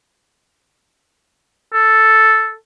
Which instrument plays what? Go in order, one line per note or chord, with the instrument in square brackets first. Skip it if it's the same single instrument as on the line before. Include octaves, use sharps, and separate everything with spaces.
[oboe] A4